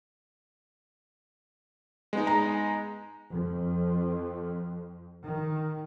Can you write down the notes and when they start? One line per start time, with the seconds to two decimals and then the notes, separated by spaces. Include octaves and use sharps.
2.13 G#3 B3 D#4
2.27 A#5
3.31 F2
5.26 D#3